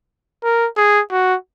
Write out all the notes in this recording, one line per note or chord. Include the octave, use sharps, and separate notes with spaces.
A#4
G#4
F#4